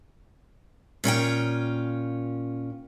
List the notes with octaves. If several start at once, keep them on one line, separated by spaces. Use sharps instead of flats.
A#2 C#4 F4 G5